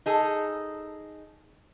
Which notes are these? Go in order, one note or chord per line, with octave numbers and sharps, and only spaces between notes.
D#4 G#4 A4